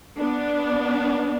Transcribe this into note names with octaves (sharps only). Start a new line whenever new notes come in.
B3 D4